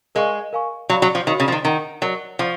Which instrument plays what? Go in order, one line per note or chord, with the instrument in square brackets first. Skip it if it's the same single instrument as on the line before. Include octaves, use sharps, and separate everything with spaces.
[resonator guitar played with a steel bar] G#3 [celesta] A#4 F5 G#5 C#6
[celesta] A#4 F5 G#5 C#6
[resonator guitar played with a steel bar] F#3 [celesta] F#4 C#5 F5 B5
[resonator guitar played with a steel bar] F#3
F3
[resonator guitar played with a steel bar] D#3 [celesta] F#4 C#5 F5 B5
[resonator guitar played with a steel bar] C#3
F3
D#3
[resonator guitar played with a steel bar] D#3 [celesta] A#4 D#5 F#5
[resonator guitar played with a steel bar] F#3 [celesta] A#4 D#5 F#5
[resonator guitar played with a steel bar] F3 [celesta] F#5 C#6